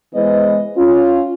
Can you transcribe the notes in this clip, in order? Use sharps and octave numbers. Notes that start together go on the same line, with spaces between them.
E3 G#3 B3 B4 C5 D#5
C#4 F4